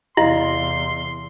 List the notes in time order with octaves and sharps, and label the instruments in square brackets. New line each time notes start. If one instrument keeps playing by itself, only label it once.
[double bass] E2 C3 [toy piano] E4 [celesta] D#5 F5 [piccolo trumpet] C6